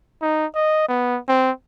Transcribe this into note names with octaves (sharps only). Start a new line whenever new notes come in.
D#4
D#5
B3
C4